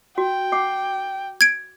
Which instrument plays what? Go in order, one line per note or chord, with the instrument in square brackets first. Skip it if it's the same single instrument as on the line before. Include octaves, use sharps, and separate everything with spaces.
[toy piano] F#4 [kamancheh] G5
[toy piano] F#5 D6
[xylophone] G#6 D7